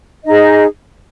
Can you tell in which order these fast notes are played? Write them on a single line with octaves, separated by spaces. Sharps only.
D#5 D#4 G#4